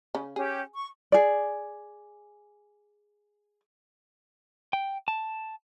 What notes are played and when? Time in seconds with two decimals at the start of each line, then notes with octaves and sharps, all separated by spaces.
0.15 C#3 C#4
0.36 C#4 G4 G#4
0.76 C#6
1.12 G#4 D5
4.73 G5
5.08 A5